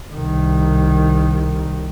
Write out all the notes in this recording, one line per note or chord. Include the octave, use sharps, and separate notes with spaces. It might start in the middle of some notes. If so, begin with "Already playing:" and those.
C2 D#3